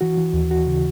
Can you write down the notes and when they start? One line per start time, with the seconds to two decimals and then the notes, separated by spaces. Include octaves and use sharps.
0.01 E3 F#4
0.18 E3
0.33 D#2
0.51 E3 F#4
0.67 C#3